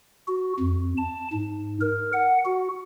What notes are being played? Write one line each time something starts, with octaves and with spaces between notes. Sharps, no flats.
F#4
F2
A5
G#2
A#4
F#5
F#4